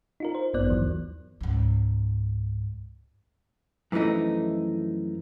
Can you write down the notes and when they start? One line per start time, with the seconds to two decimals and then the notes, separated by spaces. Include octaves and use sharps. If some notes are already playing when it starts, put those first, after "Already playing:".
0.20 D#4 F4 A#4
0.35 C5
0.54 A1 G2 B3 D5 F#6
0.69 D#2 E3 F#3
1.41 C#2 G#2
3.92 F#2 E3 F3 A3 D#4